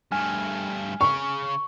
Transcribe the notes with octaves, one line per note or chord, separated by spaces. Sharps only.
G2 A3 G#5 F6
C#3 F5 C#6